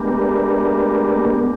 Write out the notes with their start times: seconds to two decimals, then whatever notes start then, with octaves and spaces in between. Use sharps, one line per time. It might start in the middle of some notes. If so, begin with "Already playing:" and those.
Already playing: G#3 A3 B3 D4 G4 A#4
1.17 A#3
1.33 B3